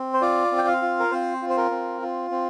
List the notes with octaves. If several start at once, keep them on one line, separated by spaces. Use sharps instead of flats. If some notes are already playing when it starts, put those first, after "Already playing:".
Already playing: C4
C5
F4 D5
C4
G5
F5
F4
A#4
C4 C5
F4
C5
A#4
C4
F4
C4